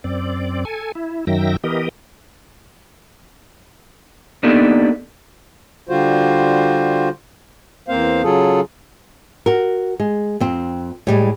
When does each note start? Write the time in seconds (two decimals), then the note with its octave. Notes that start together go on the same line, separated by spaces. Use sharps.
0.04 F#2 C4 D5
0.65 A4 G#5
0.95 E4
1.27 F#2 D#3 F#3 E5 G5 A#6
1.64 E3 B3 G4 A#4 D#5
4.43 A#3 B3 D4 D#4 G4 A4
5.89 D3 G3 F4 F#4 C5
7.88 E2 A#3 C4 C5 F5
8.23 C#3 F#3 F4 G#4 A4
9.46 F#4 A#4
10.00 G#3
10.40 F2 C4
11.07 A2 G3 G#3